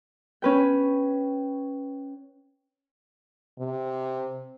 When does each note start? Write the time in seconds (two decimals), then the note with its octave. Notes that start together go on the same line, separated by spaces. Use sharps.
0.42 C#4 B4 G5
3.59 C3